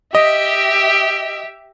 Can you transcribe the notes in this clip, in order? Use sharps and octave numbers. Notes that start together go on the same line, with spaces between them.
G4 D#5 E5